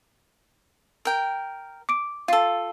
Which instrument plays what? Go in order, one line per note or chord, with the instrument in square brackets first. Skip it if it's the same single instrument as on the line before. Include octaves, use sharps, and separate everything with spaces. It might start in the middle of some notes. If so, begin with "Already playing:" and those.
[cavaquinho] A#4 G5
[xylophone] D6 D7
[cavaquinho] F4 A4 [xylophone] F5